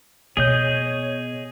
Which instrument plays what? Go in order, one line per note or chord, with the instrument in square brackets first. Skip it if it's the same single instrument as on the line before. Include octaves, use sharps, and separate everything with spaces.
[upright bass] B2 [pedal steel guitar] G#4 D#5 G6 [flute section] C#5